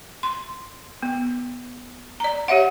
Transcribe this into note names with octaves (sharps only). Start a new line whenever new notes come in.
C6
B3
D5 A#5
G4 C#5 E5 F#5